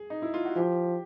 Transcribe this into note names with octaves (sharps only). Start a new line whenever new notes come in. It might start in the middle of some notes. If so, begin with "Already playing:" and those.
Already playing: G#4
D#4
E4
F4
F#4
F3 G4